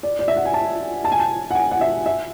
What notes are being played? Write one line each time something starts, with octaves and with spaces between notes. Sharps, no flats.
D5
D5
E5
F#5
G#5
A5
A5
G#5
A5
F#5
G#5
F#5
E5
E5